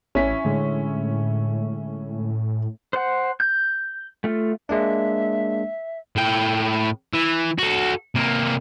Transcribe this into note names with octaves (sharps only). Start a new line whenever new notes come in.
A1 C#4 E4 B6
A2 D3 G#3
C5 F#5
G6
A3 F4
G#3 A#3 D4 E5
A2 G5
E3
F#4 A4
C3 A#3